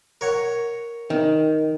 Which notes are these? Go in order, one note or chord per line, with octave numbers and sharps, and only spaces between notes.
A#4 C#5 F#5
D#3